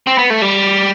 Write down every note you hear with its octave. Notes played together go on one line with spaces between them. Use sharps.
C4
B3
A3
G3